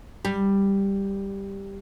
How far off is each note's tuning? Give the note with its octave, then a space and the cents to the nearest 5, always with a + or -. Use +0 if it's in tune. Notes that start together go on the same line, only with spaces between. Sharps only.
G3 +5